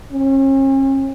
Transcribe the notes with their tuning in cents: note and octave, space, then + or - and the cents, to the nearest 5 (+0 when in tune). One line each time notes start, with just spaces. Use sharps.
C#4 -40